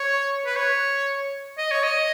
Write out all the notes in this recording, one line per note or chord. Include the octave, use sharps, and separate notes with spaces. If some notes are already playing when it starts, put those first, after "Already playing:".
Already playing: C#5
B4
C#5
D#5
C#5
D#5